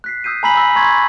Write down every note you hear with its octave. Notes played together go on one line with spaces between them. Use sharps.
F#6 B6 C7
D#6 E6 G6 C7 D#7
G#5 A#5 B5 E6 B6 F#7
E6 A#6
A#5 C6 C#6 G#6 A6 B6